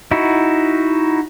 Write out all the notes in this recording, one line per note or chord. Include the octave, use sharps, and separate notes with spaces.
D#4 E4 F#4